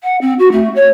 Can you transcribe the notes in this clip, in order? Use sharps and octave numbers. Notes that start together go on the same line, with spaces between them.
F#5
C4
F#4
A3
C#5